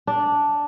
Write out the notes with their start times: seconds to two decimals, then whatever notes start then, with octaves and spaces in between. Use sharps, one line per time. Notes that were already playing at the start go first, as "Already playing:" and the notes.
0.07 D4